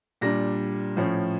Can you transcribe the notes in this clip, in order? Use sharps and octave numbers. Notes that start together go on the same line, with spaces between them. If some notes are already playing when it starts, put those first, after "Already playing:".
A#2 G3 D4 A#6
A2 F3 C#4